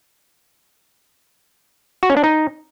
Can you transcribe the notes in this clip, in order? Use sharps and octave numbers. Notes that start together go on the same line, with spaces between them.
F#4
C#4
D4
D#4